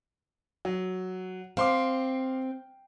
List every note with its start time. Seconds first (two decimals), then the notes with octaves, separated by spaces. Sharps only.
0.65 F#3
1.57 C4 F5 C6 D6